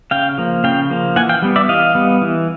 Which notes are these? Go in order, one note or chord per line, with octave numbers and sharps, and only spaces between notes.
C#3 F5 G5
F3 A#3
C#3 F5 G5
F3 A#3
E3 F#5 G#5
F5 G5
G3 B3
D5 E5
E3 D#5 F5
G3 B3
E3